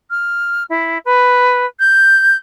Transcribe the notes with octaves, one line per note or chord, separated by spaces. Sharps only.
F6
E4
B4
G6